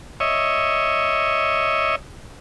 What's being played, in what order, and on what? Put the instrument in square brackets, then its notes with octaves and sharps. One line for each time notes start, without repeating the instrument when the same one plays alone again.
[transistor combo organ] C#5 D#5 E5